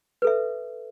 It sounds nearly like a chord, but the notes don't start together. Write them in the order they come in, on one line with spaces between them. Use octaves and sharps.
B4 A4 E5